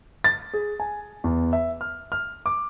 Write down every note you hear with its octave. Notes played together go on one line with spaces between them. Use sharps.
A6
G#4
G#5
E2
E5
F6
F6
D6